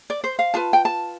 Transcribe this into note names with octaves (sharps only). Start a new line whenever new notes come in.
D5
C5
F5
F4 B4 A5
G5
A5